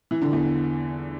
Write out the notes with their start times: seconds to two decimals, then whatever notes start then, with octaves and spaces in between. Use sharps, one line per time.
0.11 E3
0.22 D3
0.33 E2